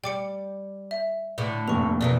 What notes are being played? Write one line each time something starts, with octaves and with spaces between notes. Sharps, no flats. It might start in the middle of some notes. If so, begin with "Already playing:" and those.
G3 G5 D6 C#7
E5
A2 D3
F1 A#1 C#6 F7
B2 D#3 E3 D5